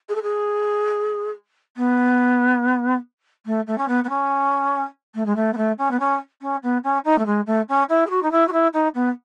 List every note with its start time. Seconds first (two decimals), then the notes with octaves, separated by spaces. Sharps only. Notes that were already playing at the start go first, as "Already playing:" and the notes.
0.09 G#4
0.15 A4
0.22 G#4
1.77 B3
3.46 A3
3.67 A3
3.78 C#4
3.88 B3
4.04 B3
4.09 C#4
5.15 A3
5.26 G#3
5.36 A3
5.53 B3
5.57 A3
5.78 C#4
5.91 B3
6.00 C#4
6.41 C#4
6.63 B3
6.84 C#4
7.05 D#4
7.18 A3
7.26 G#3
7.47 A3
7.69 C#4
7.89 E4
8.06 G#4
8.10 F#4
8.23 D#4
8.31 E4
8.48 F#4
8.52 E4
8.73 D#4
8.95 B3